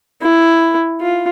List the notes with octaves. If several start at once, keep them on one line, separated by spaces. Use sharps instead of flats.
E4
F4